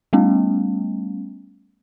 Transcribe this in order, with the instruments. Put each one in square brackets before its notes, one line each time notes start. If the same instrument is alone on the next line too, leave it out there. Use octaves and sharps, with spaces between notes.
[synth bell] G3 A3 B3 C#4